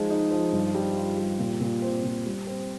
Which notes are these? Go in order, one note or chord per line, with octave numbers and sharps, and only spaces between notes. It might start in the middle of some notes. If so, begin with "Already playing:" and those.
Already playing: F3 G#3 D#4
D#4
F3
G2
G3
F4
G3
A#2
A#2
C4
A#2
G3
C4